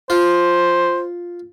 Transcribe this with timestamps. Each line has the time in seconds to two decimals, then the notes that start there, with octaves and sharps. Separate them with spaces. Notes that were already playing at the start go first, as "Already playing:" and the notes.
0.10 F4 C5